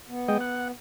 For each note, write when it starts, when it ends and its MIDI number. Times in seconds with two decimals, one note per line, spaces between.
0.08 0.71 59
0.28 0.38 56
0.28 0.38 75
0.28 0.38 79
0.41 0.68 78